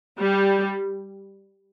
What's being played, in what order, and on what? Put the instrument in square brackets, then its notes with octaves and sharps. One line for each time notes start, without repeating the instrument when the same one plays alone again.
[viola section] G3